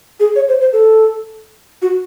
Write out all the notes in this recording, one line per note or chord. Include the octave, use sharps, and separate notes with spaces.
G#4
C#5
C5
C5
A4
F#4